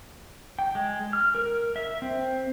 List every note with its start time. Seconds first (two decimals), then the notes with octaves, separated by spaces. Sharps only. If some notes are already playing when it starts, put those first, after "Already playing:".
0.59 G5
0.75 G#3
1.13 F6
1.35 A#4
1.76 E5
2.02 C4